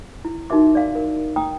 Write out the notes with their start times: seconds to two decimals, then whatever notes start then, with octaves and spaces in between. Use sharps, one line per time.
0.25 E4
0.50 D#4 F#4 A#4 E5 D6
0.75 D5 F5
0.95 A#4
1.36 G5 A#5 D#6 E6